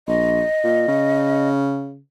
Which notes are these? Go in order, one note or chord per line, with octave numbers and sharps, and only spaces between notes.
A#1 D#5
A#2
C#3